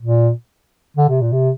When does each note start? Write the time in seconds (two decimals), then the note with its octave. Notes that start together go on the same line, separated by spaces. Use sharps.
0.02 A#2
0.97 D3
1.09 C3
1.21 A#2
1.32 C3